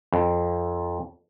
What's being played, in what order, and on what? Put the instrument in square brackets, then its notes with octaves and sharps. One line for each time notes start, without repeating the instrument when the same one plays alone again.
[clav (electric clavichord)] F2